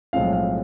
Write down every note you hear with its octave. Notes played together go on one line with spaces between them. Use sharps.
B1 A2 F3 G#3 C4 F5
F5